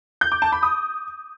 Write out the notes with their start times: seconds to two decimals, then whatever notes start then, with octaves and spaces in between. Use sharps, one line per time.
0.21 G6
0.32 D6
0.42 A5
0.52 B5
0.63 D#6